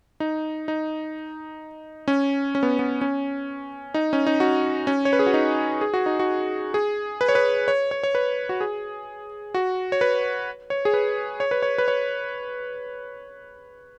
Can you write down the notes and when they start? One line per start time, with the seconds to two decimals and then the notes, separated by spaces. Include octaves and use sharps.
0.20 D#4
0.68 D#4
2.08 C#4
2.55 C#4
2.63 B3
2.79 B3
3.01 C#4
3.94 D#4
4.13 C#4
4.26 D#4
4.40 F#4
4.87 C#4
5.05 C#5
5.13 B4
5.19 G#4
5.26 F#4
5.34 D#4
5.81 G#4
5.94 F#4
6.06 D#4
6.19 F#4
6.74 G#4
7.21 B4
7.29 C#5
7.35 B4
7.68 C#5
7.91 C#5
8.03 C#5
8.15 B4
8.49 F#4
8.61 G#4
9.54 F#4
9.92 C#5
10.01 B4
10.70 C#5
10.85 G#4
10.94 B4
11.40 C#5
11.51 B4
11.62 C#5
11.78 B4
11.88 C#5